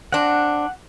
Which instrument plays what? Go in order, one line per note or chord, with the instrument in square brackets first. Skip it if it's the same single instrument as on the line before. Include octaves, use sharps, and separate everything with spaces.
[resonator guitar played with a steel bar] C4 D4 [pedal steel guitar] F#5